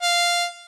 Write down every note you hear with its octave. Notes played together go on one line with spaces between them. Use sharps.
F5